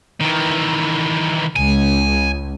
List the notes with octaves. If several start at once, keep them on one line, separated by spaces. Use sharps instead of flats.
D#3 E3
C#2 G#5